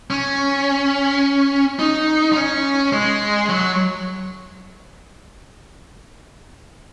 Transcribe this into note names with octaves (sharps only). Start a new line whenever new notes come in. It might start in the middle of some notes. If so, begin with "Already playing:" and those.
C#4
D#4
D#4
C#4
G#3
F#3